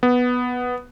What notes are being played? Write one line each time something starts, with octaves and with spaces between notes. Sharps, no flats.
B3